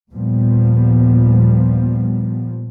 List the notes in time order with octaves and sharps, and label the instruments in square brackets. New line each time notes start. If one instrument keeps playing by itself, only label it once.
[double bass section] D#2 A#2 F3 G3 B3